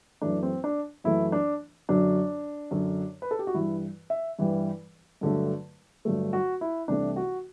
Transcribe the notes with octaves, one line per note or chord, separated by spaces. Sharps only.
F#2 E3 A3 D4
C4
D4
F#2 E3 A3 E4
D4
F#2 D3 F#3 D4
F#2 D3 F#3
B4
A4
G4
F#4
G2 E3 G3 E4
E5
G2 E3 G3
G2 D3 F#3 A3
G2 D3 F#3 A3
F#4
E4
C2 C3 E3 A3 D4
F#4